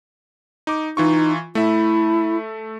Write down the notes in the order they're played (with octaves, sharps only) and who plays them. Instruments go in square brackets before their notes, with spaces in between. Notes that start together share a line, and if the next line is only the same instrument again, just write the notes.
[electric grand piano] D#4 D6
[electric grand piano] E3 F4 C#6 [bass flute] D#4
[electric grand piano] A3 E5 [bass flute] E4